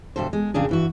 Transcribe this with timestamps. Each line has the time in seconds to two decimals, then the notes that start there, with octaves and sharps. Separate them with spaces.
0.16 D2 G2 B2 A4 C5
0.33 G#3
0.54 F2 A#2 C#3 D4 G#4
0.69 G2 E3 F#4